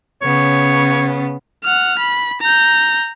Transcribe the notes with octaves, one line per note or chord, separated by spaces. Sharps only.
C#3 B3 C#4 C#5
F#5 F6
B5
A#5 G6